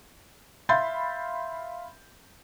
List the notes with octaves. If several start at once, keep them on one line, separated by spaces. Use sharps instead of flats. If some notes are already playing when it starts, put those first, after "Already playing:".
E5 F5 B5 C6 G6 A6